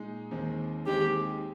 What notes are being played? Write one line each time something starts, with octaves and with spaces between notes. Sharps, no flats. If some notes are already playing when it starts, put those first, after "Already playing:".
Already playing: A#2 G#3 D#4
D#2 D#3 G#3 C4
D#2 D#3 G#3 C4 G4